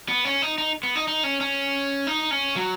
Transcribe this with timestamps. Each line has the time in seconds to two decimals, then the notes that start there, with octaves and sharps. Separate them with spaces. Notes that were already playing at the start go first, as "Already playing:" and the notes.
0.09 B3
0.25 C#4
0.42 D#4
0.58 D#4
0.83 B3
0.96 D#4
1.08 D#4
1.24 C#4
1.41 C#4
2.07 D#4
2.31 C#4
2.56 F#3